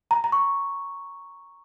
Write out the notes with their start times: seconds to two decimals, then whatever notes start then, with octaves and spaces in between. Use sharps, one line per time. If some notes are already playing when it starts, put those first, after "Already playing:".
0.11 A#5
0.24 A#5
0.32 C#6